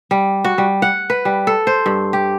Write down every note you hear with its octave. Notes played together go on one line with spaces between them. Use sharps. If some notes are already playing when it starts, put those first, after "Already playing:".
G3
F#4
G3
F#5
B4
G3
A4
C5
G2
G4